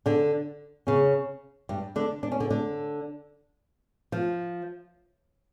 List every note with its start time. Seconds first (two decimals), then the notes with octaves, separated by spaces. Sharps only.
0.06 D3 D4
0.87 C#3 C#4
1.69 G2 G3
1.96 D3 D4
2.23 D4
2.32 C#4
2.40 D3 D4
2.50 D3 D4
4.12 F3